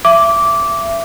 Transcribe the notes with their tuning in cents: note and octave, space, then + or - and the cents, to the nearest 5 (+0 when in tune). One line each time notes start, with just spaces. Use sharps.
E5 +25 D6 -15